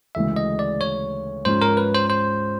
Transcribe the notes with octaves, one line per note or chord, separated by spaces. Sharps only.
D2 C#3 E3 G#3 E5
D#5
D5
C#5
G#2 F3 G#3 C#4 C5
A#4
B4
C5
C5